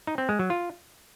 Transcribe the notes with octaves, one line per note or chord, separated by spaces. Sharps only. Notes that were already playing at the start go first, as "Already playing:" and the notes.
D#4
C4
G#3
F#3
F4